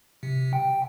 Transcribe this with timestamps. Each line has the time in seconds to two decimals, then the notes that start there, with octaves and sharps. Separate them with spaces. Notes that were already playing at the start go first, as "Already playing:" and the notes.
0.23 C3
0.53 G5